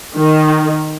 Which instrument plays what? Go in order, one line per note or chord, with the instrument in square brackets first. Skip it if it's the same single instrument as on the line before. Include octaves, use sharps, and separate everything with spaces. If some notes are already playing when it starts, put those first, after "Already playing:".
[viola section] D#3